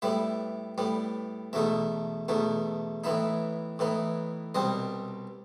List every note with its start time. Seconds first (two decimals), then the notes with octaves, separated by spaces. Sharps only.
0.02 A2 G3 B3 E5
0.78 A2 G3 B3
1.53 E2 B2 A3 D#4 E5
2.29 E2 B2 A3 D#4
3.04 A2 E3 B3 D#4 E5
3.79 A2 E3 B3 D#4
4.55 C2 B2 G3 C4 D#5